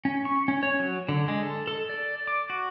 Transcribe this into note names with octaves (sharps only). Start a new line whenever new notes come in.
C#4
C#6
C#4
C#5
F#3
D3
G#3
A4
A4
D5
D6
F#4